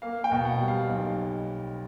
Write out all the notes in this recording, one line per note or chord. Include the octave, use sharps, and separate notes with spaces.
A#3 F5
G5
B2
F5
F#5
G3
F5
B1